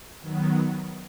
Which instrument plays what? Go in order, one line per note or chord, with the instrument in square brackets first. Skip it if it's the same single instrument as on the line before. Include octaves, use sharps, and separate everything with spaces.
[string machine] D#3 F#3 B3